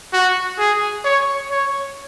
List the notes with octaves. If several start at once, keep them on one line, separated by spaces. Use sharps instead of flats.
F#4
G#4
C#5
C#5